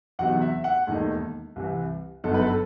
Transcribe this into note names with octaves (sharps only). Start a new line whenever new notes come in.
E2 C3 F#3 B3 D#4 F#5
E5
F#5
E1 D#2 D#3 A3 D#4
C2 C3 E3
G1 F#2 F#3 B3 D#4 A4
B4
A4